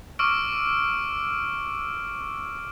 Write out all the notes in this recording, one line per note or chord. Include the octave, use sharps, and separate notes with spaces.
C#6 D6 E6 F6 D7